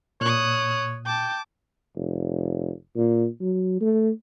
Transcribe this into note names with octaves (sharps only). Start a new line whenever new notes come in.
A#2 C#5 D#6 F#6
G5 A5 D6
F1
A#2
F#3
A3